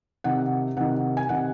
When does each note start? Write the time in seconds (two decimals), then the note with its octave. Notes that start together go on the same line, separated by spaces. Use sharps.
0.24 C3 D#3 F#5
0.77 C3 D#3 F#5
1.17 G#5
1.29 C3 D#3 F#5